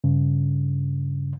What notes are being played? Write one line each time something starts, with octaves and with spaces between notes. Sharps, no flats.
G2 C#3